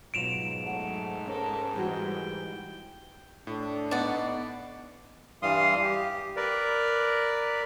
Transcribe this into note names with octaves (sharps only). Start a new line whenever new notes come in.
G#2 B2 F#3 F4 D#5 D7 E7 F7
F#3 A3 F#5
C#4 A4 A#4
E3 G3 F#4 G5
A2 D4 A4
B3 D#4 D5 F#5
G2 E3 G3 F5 C6 D#6
G4
A#4 B4 D5